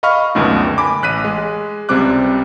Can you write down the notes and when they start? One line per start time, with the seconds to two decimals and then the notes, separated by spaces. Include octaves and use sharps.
0.03 D#5 F5 B5 C#6 F6
0.35 C#2 F#2 B2 D3 D#3 A3
0.78 G#5 B5 D6
1.03 A1 F#6 B6 D#7
1.24 G#3
1.89 C#2 C3 G3 C4 D6 F#6